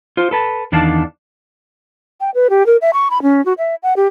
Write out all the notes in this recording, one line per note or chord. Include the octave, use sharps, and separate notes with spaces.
F4 C5
A4 B4 A5
E2 D#3 D4 D5 F5 A5
G5
B4
G4
A#4
E5
C#6
B5
C#4
F#4
E5
F#5
G4